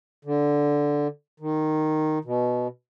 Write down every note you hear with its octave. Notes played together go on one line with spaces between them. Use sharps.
D3
D#3
B2